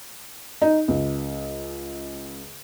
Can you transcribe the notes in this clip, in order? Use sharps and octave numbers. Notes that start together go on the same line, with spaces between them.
D#4
C#2